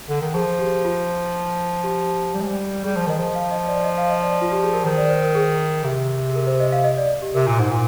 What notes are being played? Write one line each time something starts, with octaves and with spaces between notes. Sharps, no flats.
D3
D#3
F3 G#4
G4
F4
G4
G3
G#3
G3
G3 G#4
F3
D#3 D#5
F3
F5
D#5
D5
D#5
F5
D#5
D5
F4
G4
G#4
A#4
D#3 C5
D5
C5
A#4
G#4
C3
A#4
C5
D#5
F5
D#5
D5
G4
C3 A#4
A#2
G#2
A#2